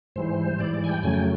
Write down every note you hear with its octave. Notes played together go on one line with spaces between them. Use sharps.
G#2 E3 G3 C5
G#2 E3 G3 D5
D5
G#5
G5
F2 C#3 F#3 A3 G#5
G5